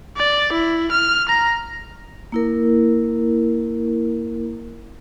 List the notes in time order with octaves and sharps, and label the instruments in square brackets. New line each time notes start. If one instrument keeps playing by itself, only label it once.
[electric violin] D5
E4
F6
A#5
[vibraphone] A#3 E4 A#4